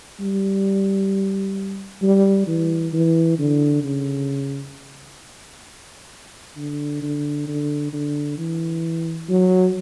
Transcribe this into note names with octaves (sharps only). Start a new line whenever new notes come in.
G3
G3
E3
E3
D3
C#3
D3
D3
D3
D3
E3
F#3